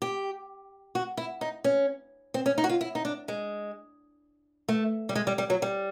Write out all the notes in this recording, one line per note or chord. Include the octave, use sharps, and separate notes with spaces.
G4
F#4
E4
D#4
C#4
C4
C#4
D#4
F#4
F4
E4
D#4
D4
G#3
A3
G3
G#3
G3
G3
F#3
G3